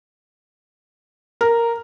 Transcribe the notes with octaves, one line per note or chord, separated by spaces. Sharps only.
A#4